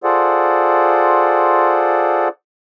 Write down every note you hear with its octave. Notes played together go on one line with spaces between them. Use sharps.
F4 G#4 A4 C5 D5 F#5